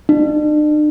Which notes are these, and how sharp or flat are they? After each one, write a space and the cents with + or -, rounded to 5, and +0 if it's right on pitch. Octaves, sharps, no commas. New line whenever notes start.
D4 +45